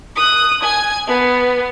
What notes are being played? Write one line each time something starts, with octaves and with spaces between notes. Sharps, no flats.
D#6 F#6
G#5 G#6
B3